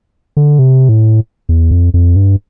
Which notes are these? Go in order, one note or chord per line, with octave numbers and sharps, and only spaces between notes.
D3
C3
A2
E2
F2
F2
G2